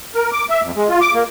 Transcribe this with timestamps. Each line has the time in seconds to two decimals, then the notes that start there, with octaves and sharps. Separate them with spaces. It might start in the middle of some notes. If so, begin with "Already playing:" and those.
0.14 A#4
0.32 D6
0.50 E5
0.62 F2
0.76 G#3
0.89 F4
1.01 D6
1.14 A#3